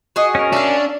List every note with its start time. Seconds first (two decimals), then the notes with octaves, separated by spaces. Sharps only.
0.16 F#4 G#4 D#5
0.35 C#4 A#4
0.53 D4 E5 F5